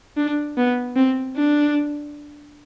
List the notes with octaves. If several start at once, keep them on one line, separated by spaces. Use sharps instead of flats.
D4
B3
C4
D4